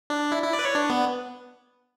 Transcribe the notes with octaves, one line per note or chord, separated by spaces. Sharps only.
D4
E4
E4
D5
B4
C#5
D4
B3